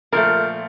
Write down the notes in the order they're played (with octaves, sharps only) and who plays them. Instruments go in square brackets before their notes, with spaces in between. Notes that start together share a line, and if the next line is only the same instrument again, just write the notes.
[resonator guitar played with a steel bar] A#2 F3 A3 A#4